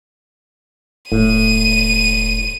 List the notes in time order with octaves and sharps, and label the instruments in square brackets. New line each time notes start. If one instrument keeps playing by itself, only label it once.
[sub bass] E1 [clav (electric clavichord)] A2 [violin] D#7